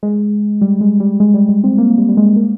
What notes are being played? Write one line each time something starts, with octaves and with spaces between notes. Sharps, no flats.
G#3
G3
G#3
G3
G#3
G3
G#3
C4
A#3
G3
G3
G#3
A#3